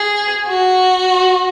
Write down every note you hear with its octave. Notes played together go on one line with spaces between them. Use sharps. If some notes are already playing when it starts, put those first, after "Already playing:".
Already playing: G#4
F#4